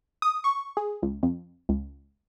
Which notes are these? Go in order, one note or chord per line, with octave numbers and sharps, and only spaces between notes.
D#6
C#6
G#4
C#2
F2
C#2